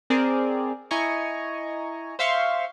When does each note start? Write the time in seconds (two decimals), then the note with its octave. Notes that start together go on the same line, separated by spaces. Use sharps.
0.10 C4 G#4 A#4 D5
0.91 E4 D#5 G#5 A#5 C#6
2.19 C5 E5 F5 C6 C#6